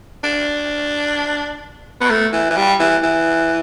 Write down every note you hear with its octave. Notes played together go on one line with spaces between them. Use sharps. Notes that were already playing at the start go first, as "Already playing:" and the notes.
D4
B3
A3
E3
E3
G3
E3
E3